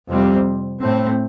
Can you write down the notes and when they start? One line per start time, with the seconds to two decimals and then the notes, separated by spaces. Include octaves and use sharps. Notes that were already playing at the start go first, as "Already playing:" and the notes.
0.08 F2 C3 G3 C4
0.80 A2 A3 C4